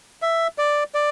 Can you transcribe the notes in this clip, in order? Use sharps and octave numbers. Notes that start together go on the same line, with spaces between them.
E5
D5
D5